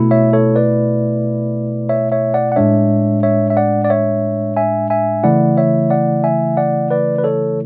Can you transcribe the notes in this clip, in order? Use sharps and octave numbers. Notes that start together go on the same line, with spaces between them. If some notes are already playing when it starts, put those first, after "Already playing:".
Already playing: B2 A3 E4
C#5 E5
A4 C#5
B4 D5
C#5 E5
C#5 E5
D5 F#5
F#5
A2 G#3 D4 C#5 E5
C#5 E5
E5
D5 F#5
D5
C#5 E5
E5 G#5
E5 G#5
C#3 E3 A3 E4 D5 F#5
C#5 E5
D5 F#5
E5 G#5
D5 F#5
B4 D5
B4
A4 C#5